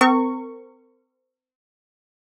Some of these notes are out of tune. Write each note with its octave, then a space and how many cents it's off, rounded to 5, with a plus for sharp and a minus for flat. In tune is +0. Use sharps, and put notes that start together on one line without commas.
C4 -30 A#4 -35 C#6 +0